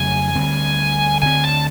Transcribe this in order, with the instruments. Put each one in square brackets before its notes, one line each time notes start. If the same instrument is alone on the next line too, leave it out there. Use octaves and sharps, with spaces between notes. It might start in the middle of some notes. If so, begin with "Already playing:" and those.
Already playing: [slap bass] F2 C#3 F#3 A3 [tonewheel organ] G#5
[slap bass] D2 D3 G3 C4
[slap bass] D2 D3 G3 C4 [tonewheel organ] G#5
[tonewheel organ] A5